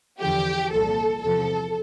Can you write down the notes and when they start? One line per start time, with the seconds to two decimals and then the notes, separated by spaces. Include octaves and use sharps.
0.21 E2 D3 F3 G4
0.71 C2 A#2 F3 A4
1.22 E2 C3 F3 A4